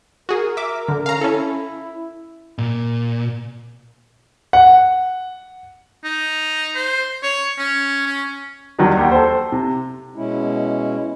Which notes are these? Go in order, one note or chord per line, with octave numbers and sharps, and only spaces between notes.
F#4 G#4 A#4
E5 D6
D3
C#4 F5 A#5
C#4 E4 A4
A#2
F#5
D#4
C5
C#5
C#4
C#4
E2 D#3 F#3 G3 D4
D#2 G4 F#5
A4 C5
C3
B2 G#3 C#4 E4